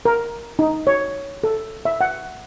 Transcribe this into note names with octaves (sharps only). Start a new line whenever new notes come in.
A#4
D#4
C#5
A4
E5
F#5